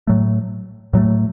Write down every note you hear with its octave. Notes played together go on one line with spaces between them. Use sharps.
A2 F#3 A3
A2 F#3 A3